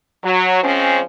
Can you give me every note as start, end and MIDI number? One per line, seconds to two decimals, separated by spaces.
0.24 0.60 54
0.63 1.00 53
0.63 1.00 56
0.63 1.00 60
0.63 1.00 61